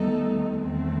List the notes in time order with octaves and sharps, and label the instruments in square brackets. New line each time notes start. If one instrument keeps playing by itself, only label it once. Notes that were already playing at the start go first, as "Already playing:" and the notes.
Already playing: [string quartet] D#2 D#3 A3 D#4 A4 [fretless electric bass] G3 B3
[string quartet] E2 D#3 A3 C4